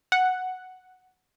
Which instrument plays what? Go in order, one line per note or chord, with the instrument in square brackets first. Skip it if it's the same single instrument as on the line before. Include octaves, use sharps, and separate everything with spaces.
[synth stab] F#5